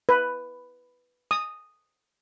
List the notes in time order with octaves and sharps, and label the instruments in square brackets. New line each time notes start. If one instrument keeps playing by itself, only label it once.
[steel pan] B4
D#6